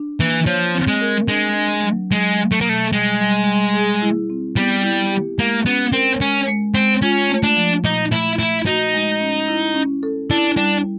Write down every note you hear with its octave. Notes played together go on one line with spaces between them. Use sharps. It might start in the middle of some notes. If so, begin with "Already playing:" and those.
Already playing: D4
E3 A#3
F3 C#5
C4
G#3
A#4
G#3 D4
D4
F#3
F#3 G#3
F#3
A3
A#3
B2 A3
G3 G#3
G3
G3
G#4
E4
C4
G3 B3
E4
G4
G#3 A#3
B3 C#4
C4 A#4
G#3 C#4
G#3
G#3 C4
C#4 F4
A3
D4
F3
A#2 D#4
A3 E4
A3 E4
D#4 F#4
G#3
C#4
E4
C#4
A4
D4 E4
G3 D4